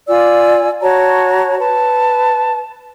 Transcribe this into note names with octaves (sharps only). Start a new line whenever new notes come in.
F4 D5 G#5 E6
F#4 C#5 A5 A#5
B4 A5